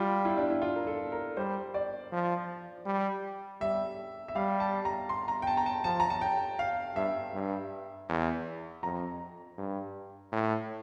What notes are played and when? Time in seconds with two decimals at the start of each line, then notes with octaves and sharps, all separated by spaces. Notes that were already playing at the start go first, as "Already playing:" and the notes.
Already playing: G3 F4
0.25 E4
0.38 D4
0.50 E4
0.62 F4
0.76 A#4
0.87 A4
1.12 A#4
1.37 G3 C5
1.74 D5
2.12 F3
2.86 G3
3.61 G3 E5
4.28 E5
4.35 G3 F5
4.60 A5
4.85 A#5
5.09 C6
5.28 A#5
5.42 G5
5.47 A5
5.57 A#5
5.66 A5
5.84 F3 A5
6.00 A#5
6.10 A5
6.21 G5
6.59 F5
6.96 G2 E5
7.34 G2
8.09 E2
8.83 F2 A#5
9.58 G2
10.32 A2